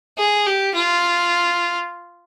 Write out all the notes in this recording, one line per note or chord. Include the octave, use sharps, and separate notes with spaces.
G#4
G4
F4